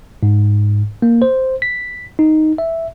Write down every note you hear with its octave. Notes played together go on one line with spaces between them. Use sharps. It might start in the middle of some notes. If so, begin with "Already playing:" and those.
G#2
A#3
C5
B6
D#4
E5